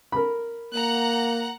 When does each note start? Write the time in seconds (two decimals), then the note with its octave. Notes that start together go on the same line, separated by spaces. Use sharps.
0.12 A#4 B5
0.73 A#3 F#5 A#5 F#6